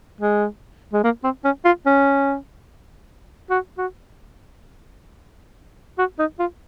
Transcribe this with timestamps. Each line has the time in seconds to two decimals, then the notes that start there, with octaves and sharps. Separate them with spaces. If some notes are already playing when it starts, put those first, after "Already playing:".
0.21 G#3
0.93 G#3
1.04 A#3
1.24 C4
1.44 C#4
1.65 F4
1.86 C#4
3.50 F#4
3.78 F#4
5.98 F#4
6.19 D#4
6.39 F4